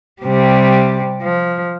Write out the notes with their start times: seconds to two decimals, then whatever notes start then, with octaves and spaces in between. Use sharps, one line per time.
0.22 C3 G3
1.22 F3